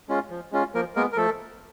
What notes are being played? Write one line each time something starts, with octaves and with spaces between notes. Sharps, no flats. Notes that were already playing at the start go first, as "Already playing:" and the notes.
G#3 C#4 F4
F3
G#3 C#4 F4
F3 A#3 A#4
G#3 A#3 B3 A#4
A#4
F3 A3 A4